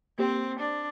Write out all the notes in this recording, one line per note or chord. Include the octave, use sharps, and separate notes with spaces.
A#3 C4 G4 C5
D4